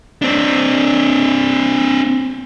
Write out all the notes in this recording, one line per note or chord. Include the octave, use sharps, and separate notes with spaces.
C4 D4